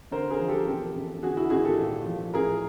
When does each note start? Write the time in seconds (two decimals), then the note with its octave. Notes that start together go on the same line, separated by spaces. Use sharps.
0.11 D3 A#4 C5
0.30 G#4 A#4
0.40 F3
0.48 G4 A4
0.67 E1
0.95 E1
1.23 D3 F#4 G#4
1.37 E4 F#4
1.50 G#1 F#4 G#4
1.64 G4 A4
1.79 A#2
2.06 F3
2.34 A2 G#4 A#4